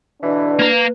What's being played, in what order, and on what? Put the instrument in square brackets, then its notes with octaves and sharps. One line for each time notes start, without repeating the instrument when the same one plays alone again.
[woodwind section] B2 D3 E3 [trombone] D4
[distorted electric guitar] A#3 A#5 [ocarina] B4